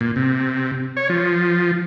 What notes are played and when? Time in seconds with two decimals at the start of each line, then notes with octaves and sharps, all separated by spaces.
0.01 A#2
0.16 C3
0.97 C#5
1.09 F3